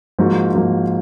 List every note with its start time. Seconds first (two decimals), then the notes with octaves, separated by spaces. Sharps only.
0.19 G#2 F3 A#3 D#4 F#4
0.54 G#2 F3 A#3 D#4 F#4